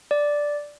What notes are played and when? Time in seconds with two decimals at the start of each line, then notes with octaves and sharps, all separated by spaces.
0.11 D5